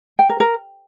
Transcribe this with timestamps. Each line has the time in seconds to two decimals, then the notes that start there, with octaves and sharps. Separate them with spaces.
0.19 G5
0.29 A#4
0.40 A#4